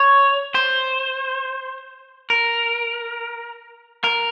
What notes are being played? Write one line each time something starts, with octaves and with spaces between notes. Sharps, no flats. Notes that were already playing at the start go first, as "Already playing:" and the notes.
Already playing: C#5
C5
A#4
A#4